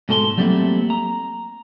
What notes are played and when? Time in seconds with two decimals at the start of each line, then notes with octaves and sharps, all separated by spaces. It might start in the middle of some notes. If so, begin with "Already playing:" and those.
0.09 G#2 B2 A4 C5 C6
0.37 F#3 G3 A3 A#3 C4 E4
0.90 A#5